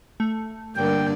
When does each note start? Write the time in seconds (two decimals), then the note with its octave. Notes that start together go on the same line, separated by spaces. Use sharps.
0.20 A3
0.76 G2 D3 A#3 D5 G5